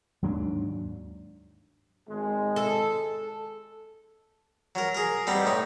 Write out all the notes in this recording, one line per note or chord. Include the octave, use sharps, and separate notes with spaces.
D#2 G#2 F#3 D4
G#1 G#3
A4
F#3 A#4
G#4 A#4
G3 B3 C4 D#4
A2 D#4